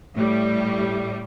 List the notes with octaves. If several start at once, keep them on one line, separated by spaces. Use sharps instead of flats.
A2 G3